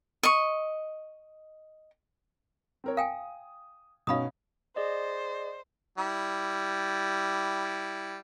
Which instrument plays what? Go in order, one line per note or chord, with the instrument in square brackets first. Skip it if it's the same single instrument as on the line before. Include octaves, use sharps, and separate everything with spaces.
[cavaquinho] D#5 C#6
[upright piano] C4 A#4 C#5
[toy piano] F5 G5 G#5 [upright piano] D#6
[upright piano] B2 C#4 D#4 [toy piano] F5 B5 D#6
[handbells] G#4 D5 D#5 [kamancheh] C5
[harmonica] G3 E4